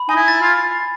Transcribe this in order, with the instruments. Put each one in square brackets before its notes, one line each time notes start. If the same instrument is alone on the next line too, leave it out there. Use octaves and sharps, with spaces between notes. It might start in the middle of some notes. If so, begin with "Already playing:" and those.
Already playing: [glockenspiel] B5
[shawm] D#4 [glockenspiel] G#5
[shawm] E4
[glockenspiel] A6
[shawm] F4